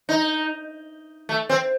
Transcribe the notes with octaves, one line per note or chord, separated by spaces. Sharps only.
D#4
A3
C4